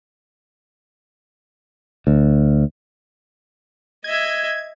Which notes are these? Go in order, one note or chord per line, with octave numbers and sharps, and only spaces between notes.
D2
D#5 E5 G#6